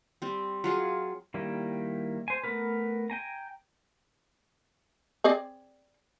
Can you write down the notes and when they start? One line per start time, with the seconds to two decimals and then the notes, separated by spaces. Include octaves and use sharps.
0.22 G3 C4
0.64 F#3 F4 G#4
1.34 D#3 G3 A#3 E4
2.28 C5 G#5
2.44 A3 B3 A#4 B4
3.10 G5 G#5 A#5
5.24 C4 G#4 D5